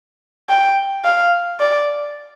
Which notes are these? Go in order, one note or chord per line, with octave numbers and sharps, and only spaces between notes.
G5
F5
D5